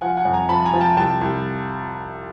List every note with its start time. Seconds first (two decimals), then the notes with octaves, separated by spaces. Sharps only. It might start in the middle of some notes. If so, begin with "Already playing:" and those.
0.01 F3 F#5 G#5
0.17 F#5 G#5
0.25 F2
0.33 G#5 A#5
0.49 F3 A5 B5
0.65 G#5 A#5
0.73 F3
0.81 G5 A5
0.97 C2 G5 A5
1.21 C2